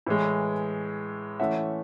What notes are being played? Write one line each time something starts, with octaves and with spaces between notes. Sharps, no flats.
A2 E3 G#3
E3 A3 C#4 E5 F#5